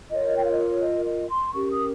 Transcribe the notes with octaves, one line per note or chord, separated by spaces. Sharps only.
F4 A#4 C#5 D#5
G5
F5
D#5
C#5
D#5
D#5
C6
C#4 G4 A#4 C#6
D#6